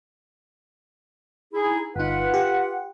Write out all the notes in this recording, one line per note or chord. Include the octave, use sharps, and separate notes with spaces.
D#4 E4 G#4
G1 D#4 F4 B4 F#5
G4